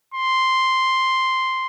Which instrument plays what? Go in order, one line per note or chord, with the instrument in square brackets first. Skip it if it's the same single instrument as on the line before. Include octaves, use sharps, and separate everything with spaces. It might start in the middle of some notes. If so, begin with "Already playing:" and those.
[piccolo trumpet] C6